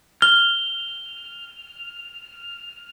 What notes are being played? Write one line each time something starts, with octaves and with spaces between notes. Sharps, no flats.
F6 G7